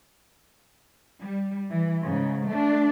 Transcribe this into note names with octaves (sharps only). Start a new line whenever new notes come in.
G3
E3
G#2 C#3
A3 D4